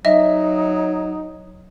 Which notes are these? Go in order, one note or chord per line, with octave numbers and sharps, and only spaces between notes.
F#3 D#4 D#5 E5